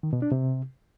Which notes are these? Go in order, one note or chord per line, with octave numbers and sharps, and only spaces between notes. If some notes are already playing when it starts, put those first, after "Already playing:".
D#3
B2
D4
C3